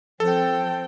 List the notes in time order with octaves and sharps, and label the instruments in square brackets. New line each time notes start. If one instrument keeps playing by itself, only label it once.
[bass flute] F3 [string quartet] C4 G5 [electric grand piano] A4